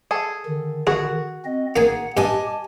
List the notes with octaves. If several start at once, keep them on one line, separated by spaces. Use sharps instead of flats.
G#4 A4
D3 D#3
F#4 G#4
C4 D#5
D#3 A#3 G#4 F#5 G#5
G2 G4 D#5 G#5 A5